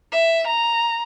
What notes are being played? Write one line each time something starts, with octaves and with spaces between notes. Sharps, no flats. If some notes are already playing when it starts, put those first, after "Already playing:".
E5
A#5